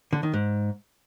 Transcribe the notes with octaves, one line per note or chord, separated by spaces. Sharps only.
D3
D#3
G#2